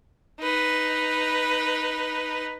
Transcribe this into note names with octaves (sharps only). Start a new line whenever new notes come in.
D#4 B4